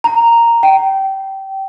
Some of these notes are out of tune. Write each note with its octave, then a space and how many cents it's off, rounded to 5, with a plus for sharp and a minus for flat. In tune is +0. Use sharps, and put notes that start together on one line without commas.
A#5 -5
G5 -20